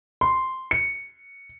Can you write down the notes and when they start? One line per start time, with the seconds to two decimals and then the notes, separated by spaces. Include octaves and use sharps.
0.21 C6
0.71 C#7